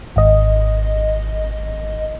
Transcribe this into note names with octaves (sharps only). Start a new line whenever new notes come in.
G#1 D#5